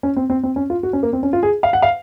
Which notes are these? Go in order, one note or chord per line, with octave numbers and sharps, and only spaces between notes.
C#4
C4
C4
C4
C#4
F4
F#4
C#4
A#3
C4
C#4
F4
G#4
F5
F#5
F5